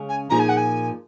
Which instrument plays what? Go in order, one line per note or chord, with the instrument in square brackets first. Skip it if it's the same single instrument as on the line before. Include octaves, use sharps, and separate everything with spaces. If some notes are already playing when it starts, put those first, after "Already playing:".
Already playing: [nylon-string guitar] C#3 G#3 C#4
[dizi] G#5
[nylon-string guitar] A#2 F3 A#3 D#4 G#4 [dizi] A#5
[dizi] G#5
F#5
G#5